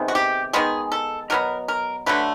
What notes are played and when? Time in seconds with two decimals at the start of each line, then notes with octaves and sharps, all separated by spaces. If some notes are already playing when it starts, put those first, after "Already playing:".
Already playing: C3 D#3 G#3 B3
0.08 F#4
0.15 G4
0.53 D#3 G#3 B3 G#4
0.92 A4
1.30 B2 F#3 B3 A#4
1.68 A#4
2.06 D3 F#3 A3 B4